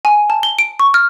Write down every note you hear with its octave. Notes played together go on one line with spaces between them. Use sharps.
G#5
A5
G7
D7
C#6
F6